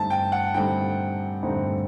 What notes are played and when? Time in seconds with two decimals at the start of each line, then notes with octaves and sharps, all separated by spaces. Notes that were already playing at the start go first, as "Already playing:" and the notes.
Already playing: G2 D3 A3 C4 D#4 A5
0.10 G5
0.32 F#5
0.54 G2 D3 A3 C4 D#4 G5
1.43 G2 D3 A3 C4 D#4